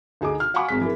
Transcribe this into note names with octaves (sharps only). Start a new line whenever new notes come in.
D2 D#4 G#4 D#5 D6
F6
F5 F#5 G#5 B5 C#6 D6
G#1 G#3 B6
E3 G#4 A#4